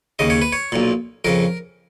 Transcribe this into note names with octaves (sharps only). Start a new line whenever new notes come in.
D#2 C#3 D#5
C#5
B4
C#5
B1 A#2
F2 C#3 A#4